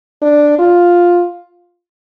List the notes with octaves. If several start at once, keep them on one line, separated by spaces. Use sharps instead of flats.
D4
F4